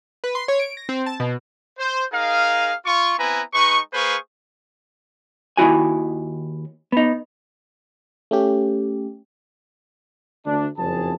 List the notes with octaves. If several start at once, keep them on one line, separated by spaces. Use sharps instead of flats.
B4
C6
C#5
D7
A#6
C4
A5
B2
C5
D#4 G#4 A#4 F5
F4 C#6
B3 C4 E4 B4 G#5 A#5
G#3 D#4 B4 C#6
A#3 G#4 B4 C5 F5 C#6
D#2 D#3 E4 F#4 G#5
B3 D#4
A3 C#4 G4
D2 D4
F#1 F2 G#4 A5